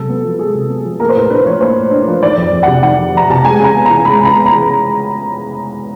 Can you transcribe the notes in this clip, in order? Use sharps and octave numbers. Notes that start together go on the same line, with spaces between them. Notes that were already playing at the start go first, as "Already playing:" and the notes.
Already playing: C3 F#3 G#3 A4
B3
F3
G#3 G#4
C3
B3
F3
A#3 A#4
C5
A2 B4
A#4
D4 B4
F3 C#5
A#3 C5
A2
D4
F3
D#3 D5
F2
F2
C3 F#5
D#3 F#5
F2
F2 A#5
C3 A5
G#3 G#5
C#3 A#5
B3
E3 A#5
G#3 B5
C#3 A#5
B3
A#5
E3